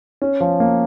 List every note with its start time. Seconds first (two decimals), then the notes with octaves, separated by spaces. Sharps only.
0.22 C#4
0.41 F3
0.60 A#3